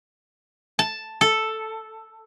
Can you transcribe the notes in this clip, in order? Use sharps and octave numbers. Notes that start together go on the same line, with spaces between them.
A5
A4